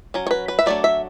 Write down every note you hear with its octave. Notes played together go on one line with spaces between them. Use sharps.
F#3 C#4
C#5
B4
B4
E5
F#3 A3 D4 D5
E5